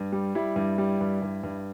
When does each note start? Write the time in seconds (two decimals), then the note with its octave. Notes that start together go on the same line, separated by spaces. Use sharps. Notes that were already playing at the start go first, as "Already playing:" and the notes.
Already playing: G2
0.12 G3
0.35 G3 E4
0.56 G2
0.78 G3
1.01 G2
1.22 G2
1.43 G2